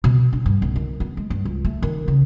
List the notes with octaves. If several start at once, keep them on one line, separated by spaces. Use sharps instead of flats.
B2
D4
G2
B1
D#3
B3
G#3
G2
C#2
A3
D#3
C#3